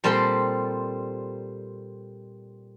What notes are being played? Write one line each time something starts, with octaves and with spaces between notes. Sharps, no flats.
A#2 G3 C4 A4 C5 G5